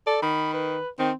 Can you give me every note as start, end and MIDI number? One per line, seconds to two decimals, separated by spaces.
0.07 0.18 69
0.07 0.20 74
0.22 0.79 51
0.22 0.53 83
0.54 0.88 71
0.99 1.11 51
0.99 1.13 60